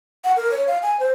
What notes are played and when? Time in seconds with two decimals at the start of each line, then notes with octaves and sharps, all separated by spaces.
0.24 F#5
0.36 A#4
0.51 C#5
0.68 F5
0.82 G#5
1.00 C5